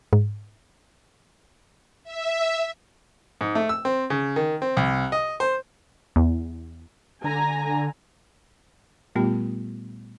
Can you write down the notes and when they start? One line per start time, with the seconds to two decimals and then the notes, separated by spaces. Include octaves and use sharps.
0.13 G#2
2.04 E5
3.41 G#2
3.55 A3
3.69 E6
3.85 C4
4.10 C#3
4.36 D#3
4.62 C4
4.77 C2
5.12 D#5
5.40 C5
6.16 E2
7.24 D3 G#5 A#5
9.16 A#2 G3 A3 B3 F4 G4